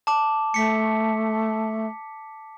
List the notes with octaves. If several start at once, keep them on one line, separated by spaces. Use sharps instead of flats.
A5 D6
A3 B6 C#7